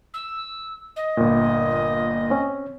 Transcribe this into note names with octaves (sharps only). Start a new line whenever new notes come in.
E6
D#5
G1 A#2
C4 C#4